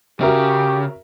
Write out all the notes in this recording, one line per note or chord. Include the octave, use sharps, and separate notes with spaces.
C#3 F#4 G4 A#4 E5